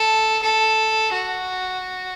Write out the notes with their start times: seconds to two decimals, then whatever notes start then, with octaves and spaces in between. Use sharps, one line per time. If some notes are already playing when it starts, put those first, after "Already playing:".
Already playing: A4
0.42 A4
1.13 F#4